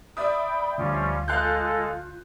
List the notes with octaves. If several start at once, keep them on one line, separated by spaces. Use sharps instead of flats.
D5 E5 G5 B5 D#6
D2 F3 G3 C#4 F4
G#3 A4 F5 F#6 G6